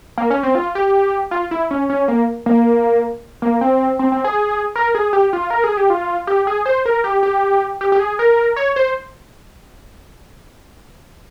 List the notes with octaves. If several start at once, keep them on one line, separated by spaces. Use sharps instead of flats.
A#3
C#4
C4
F4
G4
F4
E4
C#4
C#4
A#3
A#3
A#3
C4
C4
C4
G#4
A#4
G#4
G4
F4
A#4
G#4
G4
F4
G4
G#4
C5
A#4
G4
G4
G4
G4
G#4
A#4
C#5
C5